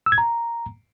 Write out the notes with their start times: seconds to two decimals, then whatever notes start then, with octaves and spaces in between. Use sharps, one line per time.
0.06 E6
0.12 G#6
0.18 A#5